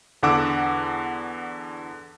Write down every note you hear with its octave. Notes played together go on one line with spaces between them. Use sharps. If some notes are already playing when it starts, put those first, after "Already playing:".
E2 D3 F#5 D6 E6